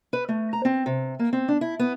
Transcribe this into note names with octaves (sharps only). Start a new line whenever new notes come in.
B4
A3
A#5
C4
C3
A#3
C4
D4
E4
B3